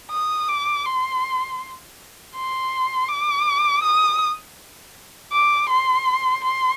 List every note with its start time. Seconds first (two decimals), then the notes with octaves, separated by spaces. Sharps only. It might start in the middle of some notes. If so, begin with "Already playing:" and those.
0.11 D#6
0.48 D6
0.85 C6
2.35 C6
3.09 D6
3.84 D#6
5.32 D6
5.69 C6
6.44 C6